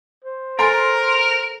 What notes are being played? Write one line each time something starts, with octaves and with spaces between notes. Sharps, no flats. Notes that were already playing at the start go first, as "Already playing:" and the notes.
C5
A4 A#4 G#5 A#5 C6 A6 D7